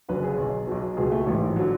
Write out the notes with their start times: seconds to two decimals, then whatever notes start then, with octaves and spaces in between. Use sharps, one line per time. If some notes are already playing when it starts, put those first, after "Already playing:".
0.09 F#1 F#2 D3 B4
0.24 G#4
0.38 B1 B2
0.67 B1 B2
0.97 C#2 B2 G#4
1.12 A3
1.26 A1 G#2 A3
1.49 F3
1.56 D3 F#3